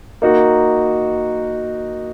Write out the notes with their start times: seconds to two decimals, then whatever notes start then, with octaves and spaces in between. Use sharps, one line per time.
0.22 A#3 D#4 F#4